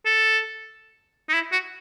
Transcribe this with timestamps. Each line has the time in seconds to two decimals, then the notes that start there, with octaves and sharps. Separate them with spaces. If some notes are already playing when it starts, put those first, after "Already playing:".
0.06 A4
1.29 D#4
1.34 E4
1.52 F#4